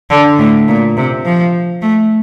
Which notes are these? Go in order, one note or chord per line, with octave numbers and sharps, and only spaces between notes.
D3
A2
A#2
C3
F3
A3